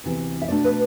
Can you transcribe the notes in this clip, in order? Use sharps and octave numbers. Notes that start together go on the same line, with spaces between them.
D2 C3 E3 B3
E5
B2 A3 D4 D5
B4